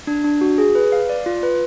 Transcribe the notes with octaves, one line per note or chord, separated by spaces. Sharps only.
D4
D4
F#4
G#4
B4
F5
D5
F4
B4